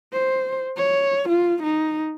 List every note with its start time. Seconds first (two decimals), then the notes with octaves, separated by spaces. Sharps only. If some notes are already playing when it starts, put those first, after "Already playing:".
0.13 C5
0.77 C#5
1.29 F4
1.63 D#4